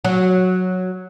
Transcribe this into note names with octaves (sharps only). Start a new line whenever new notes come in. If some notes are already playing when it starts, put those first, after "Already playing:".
F#3